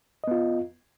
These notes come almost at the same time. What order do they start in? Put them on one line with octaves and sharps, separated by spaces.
D#5 B3 F4